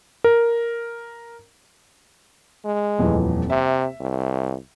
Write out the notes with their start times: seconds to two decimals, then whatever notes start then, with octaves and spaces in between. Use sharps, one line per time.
0.24 A#4
2.65 G#3
2.99 D#1 F2 E3
3.50 C3 E5
4.00 C2